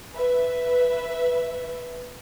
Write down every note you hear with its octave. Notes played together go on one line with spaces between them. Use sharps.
B4 E5